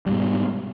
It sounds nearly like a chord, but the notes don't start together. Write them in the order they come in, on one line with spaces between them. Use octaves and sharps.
G3 G#2 B2